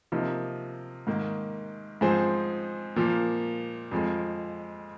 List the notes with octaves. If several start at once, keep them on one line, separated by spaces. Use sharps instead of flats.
C3 F3 A#3 D#4
G#2 D#3 A#3
G#2 F3 C4 G#4 C5
A#2 F3 A#3
F2 F3 G#3